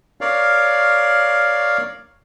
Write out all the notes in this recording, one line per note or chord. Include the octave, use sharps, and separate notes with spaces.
A#4 C#5 D5 F5